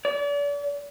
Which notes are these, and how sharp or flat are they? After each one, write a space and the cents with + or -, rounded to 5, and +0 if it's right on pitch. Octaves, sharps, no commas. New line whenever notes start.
D5 -40